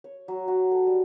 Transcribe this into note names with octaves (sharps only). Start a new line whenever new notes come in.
C#5
F#3
F#4
A4
G3